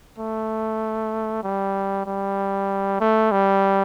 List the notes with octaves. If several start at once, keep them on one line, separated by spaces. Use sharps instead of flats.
A3
G3
G3
A3
G3